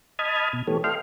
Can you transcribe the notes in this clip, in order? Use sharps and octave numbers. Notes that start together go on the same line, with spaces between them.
D#5 A5 B5 D#6 F6 G#6
B2
E3 A3 B3 G4 A4 C#5
A4 D#5 F5 G5 C6 F6